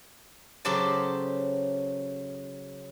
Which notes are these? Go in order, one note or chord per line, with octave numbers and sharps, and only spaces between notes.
C#3 F#3 G4 A4 C5 A5